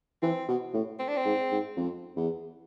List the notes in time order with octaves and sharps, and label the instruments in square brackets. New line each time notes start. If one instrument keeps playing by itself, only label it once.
[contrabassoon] E3 [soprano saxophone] C4
[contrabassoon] B2
A2
[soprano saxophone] C4
D4
C4
[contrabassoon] G#2
G#2
F2
E2